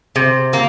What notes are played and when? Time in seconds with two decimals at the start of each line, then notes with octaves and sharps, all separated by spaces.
0.16 C3
0.53 A#3